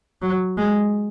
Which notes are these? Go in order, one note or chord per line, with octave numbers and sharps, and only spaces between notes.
F#3
G#3